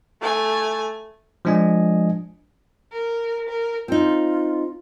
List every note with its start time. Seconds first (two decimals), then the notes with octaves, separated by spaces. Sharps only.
0.21 A3 G#5
1.45 F3 G#3 D4 D#5 G#5
2.93 A#4
3.50 A#4
3.88 C4 D#4 F4